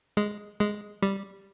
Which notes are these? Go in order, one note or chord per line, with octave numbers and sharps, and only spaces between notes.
G#3
G#3
G3